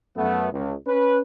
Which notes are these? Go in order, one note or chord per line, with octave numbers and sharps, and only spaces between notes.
F#2 A3 B3
C#2
C#4 B4